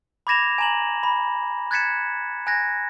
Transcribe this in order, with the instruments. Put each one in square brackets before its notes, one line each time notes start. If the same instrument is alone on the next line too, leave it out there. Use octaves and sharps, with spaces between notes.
[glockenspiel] B5 D6 G#6 A#6 E7 F7
G#5 A#5 E7 F#7
B5
F#6 G#6 A6 B6 C#7 E7
G#5 F#6 G#6 A#6